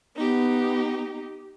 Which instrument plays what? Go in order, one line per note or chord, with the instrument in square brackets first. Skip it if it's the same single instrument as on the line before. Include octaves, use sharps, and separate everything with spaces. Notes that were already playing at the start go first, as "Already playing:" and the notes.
[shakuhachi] B3 [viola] D#4 G4